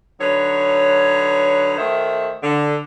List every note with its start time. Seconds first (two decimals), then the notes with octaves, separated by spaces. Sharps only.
0.20 D3 F#3 D#4 B4 C#5
1.77 D#3 A3 F#4 C5 D#5 E5
2.43 D3